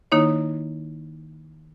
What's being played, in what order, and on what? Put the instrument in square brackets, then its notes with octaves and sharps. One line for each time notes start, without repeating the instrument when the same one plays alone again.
[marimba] D#3 A#3 D#4 E4 C#5